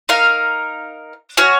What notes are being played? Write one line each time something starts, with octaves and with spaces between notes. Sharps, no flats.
D#4 A#4 F5
C#4 F#4 C#5